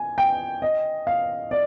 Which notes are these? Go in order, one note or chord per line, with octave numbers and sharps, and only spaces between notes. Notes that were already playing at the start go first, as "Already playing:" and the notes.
Already playing: G#5
G5
D#5
F5
D5